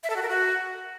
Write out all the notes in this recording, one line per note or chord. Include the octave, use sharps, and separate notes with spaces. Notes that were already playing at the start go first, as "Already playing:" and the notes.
E5
A4
F#4
A#4
F#4